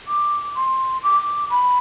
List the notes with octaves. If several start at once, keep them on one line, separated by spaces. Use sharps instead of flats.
D6
C6
D6
B5